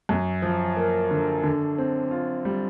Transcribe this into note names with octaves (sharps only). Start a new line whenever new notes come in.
F#2
F3
A#3
D3
D3
C4
F4
G3